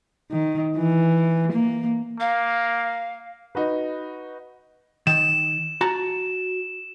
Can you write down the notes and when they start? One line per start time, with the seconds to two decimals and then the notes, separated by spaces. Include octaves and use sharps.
0.31 D#3
0.77 E3
1.52 A#3
2.20 A#3 F5
3.55 D#4 F#4 B4
5.07 D#3 E7
5.81 F#4 A5 A#5